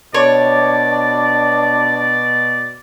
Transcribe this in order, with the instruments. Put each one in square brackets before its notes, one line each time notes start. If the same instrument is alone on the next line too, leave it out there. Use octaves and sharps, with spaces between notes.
[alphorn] B2 [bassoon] D4 [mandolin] C#5 [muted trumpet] D5